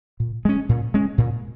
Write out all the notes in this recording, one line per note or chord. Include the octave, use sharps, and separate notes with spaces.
A#2
G#3 C#4
A#2
G#3 C#4
A#2